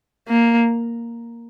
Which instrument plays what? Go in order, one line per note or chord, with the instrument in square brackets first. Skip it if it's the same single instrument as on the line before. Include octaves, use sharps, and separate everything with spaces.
[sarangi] A#3